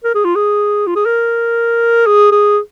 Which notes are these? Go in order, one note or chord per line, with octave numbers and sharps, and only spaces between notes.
A#4
G#4
F4
G#4
F4
G#4
A#4
G#4
G#4